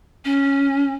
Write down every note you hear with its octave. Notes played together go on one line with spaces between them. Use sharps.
C#4